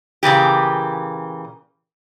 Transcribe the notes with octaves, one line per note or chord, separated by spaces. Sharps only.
A#2 C#3 E3 G4